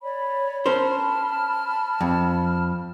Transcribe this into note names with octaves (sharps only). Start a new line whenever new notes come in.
C#5 D5 B5
C#4 A#4 C5 A5 B5 F6
F2